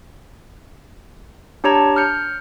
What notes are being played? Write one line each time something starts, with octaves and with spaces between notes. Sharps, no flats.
D4 G4 C#5 A5 A#5 G#6
F6 G6 C#7